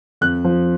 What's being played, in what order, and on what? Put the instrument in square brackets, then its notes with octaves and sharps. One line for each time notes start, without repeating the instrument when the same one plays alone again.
[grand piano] F2 F#6
F3